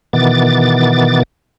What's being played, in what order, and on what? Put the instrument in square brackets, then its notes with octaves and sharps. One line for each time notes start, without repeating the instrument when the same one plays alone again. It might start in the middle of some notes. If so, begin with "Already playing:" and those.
[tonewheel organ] B2 D#3 E3 B3 D6 A6